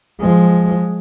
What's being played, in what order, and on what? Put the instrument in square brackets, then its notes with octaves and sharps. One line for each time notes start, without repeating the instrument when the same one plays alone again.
[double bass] F3 G#3